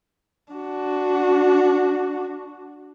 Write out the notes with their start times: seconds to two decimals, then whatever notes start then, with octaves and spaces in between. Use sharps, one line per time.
0.54 D4 F#4